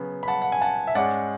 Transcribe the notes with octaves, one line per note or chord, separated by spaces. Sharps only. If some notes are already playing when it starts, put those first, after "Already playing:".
Already playing: C#3 F#3 B3
B5
F#5 A5
F#5
G#5
F#5 A5
E5
G#2 G#3 C#4 D5 F#5